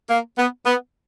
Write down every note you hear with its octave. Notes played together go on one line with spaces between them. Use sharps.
A#3
B3
B3